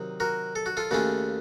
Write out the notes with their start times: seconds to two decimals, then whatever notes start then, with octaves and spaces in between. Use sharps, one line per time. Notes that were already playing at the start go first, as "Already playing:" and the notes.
Already playing: C3 D#3 F#3
0.20 F#4 A#4
0.56 A4
0.66 F#4
0.77 F4 A4
0.91 D#2 C#3 A3 C#4 F4 F#4